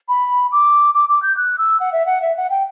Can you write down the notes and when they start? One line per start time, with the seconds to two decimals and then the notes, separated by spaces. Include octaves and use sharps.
0.09 B5
0.52 D6
0.94 D6
1.09 D6
1.22 G6
1.37 F#6
1.58 E6
1.80 F#5
1.92 E5
2.06 F#5
2.22 E5
2.37 F#5
2.50 G5